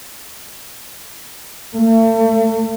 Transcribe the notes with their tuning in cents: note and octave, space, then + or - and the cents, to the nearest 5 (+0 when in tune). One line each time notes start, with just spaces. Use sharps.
A3 +40